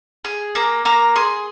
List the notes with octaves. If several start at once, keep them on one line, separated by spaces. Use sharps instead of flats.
G#4
A#3 A#5
A#3 A#5
G#4 C6